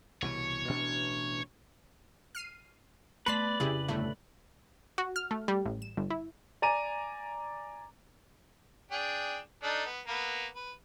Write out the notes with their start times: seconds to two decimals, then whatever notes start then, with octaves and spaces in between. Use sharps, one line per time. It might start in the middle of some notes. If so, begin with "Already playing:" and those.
0.22 C2 B2 E3 C#5
0.67 A1 B2 D4
2.35 F6 C7 D#7
3.26 A3 B3 B4 D5 A5 C6 B6
3.60 F2 C#3 E4 G4 G#4
3.88 G1 A2 A3
4.98 F#4
5.16 F6
5.31 A3
5.48 G3
5.65 A1
5.82 E7
5.97 G1
6.10 E4
6.62 D5 G#5 A#5 D#7
8.92 D4 G#4 G5
9.63 D4 D#4 A4
9.86 B3
10.07 A#3 B3 B4
10.55 B4